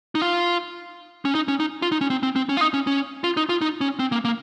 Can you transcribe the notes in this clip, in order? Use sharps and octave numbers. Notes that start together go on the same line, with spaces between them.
D#4
F4
C#4
D#4
C#4
D#4
F4
D#4
C#4
C4
C4
C4
C#4
F4
D#4
C#4
C#4
F4
D#4
F4
D#4
C#4
C4
A#3
A#3